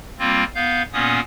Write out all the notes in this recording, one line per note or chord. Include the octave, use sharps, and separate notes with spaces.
G3 A#3 C4 F4
B3 F5 G6
A#2 A#3 B3 C#4 D#6